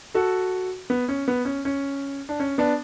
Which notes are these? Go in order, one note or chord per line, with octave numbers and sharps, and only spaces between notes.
F#4 A4
B3
C#4
B3
C#4
C#4
D4
C#4
B3 D4